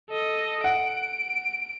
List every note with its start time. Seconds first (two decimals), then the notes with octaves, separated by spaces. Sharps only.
0.10 A4 D#5
0.64 F#5 D7